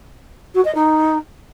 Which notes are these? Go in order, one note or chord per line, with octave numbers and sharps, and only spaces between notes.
F#4
D#5
D#4